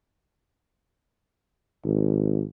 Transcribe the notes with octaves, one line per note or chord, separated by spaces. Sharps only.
G#1